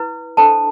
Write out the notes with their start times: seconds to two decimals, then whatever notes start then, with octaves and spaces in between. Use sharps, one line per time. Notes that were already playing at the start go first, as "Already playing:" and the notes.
Already playing: E4 B4
0.37 D4 A4 C5 A5